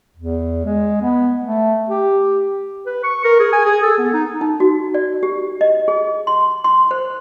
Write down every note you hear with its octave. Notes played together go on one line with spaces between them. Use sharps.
E2
G#3
B3
A3
G4
B4
C#6
A#4
G#4
G#5
G#4
A4
B3
D#4
D#4
F#4
D5
G4
D#5
G#4
C6
C6
C5